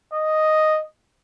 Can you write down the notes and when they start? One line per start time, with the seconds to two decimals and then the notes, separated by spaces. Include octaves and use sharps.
0.13 D#5